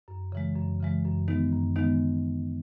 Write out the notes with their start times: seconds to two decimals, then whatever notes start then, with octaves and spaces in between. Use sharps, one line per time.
0.08 F#2
0.32 C#3 E3 G#3
0.56 F#2
0.80 C#3 E3 G#3
1.05 F#2
1.28 D#3 G#3 B3 D#4
1.53 F#2
1.76 D#3 G#3 B3 D#4